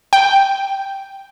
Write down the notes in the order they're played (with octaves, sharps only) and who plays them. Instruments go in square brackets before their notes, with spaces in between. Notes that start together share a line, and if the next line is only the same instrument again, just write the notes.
[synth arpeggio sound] G5